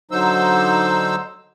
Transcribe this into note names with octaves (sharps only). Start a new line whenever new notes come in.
D3 F#3 D#4 C5 E6